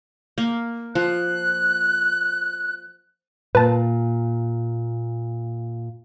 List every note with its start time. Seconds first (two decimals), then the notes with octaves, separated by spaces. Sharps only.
0.38 A#3
0.95 F3 F#6
3.55 A#2 B4 A5